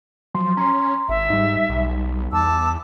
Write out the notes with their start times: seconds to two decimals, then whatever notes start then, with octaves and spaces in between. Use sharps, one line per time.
0.34 F3 F#3 C6
0.57 C#4 A#5 C6
1.09 G#1 E5
1.30 G#2 G3 D#4
1.69 B1
2.32 E2 A5 D6 E6